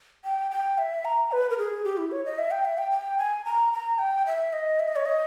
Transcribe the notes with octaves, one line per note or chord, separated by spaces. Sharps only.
G5
G5
E5
A#5
B4
A#4
G#4
G4
E4
C#5
D#5
E5
G5
E5
G5
G5
G#5
A#5
A#5
G5
E5
D#5
E5
D#5
C#5
D#5